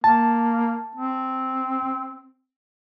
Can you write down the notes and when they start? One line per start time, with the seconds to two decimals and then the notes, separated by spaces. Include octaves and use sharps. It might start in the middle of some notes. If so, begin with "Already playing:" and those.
0.04 A#3 A5
0.95 C4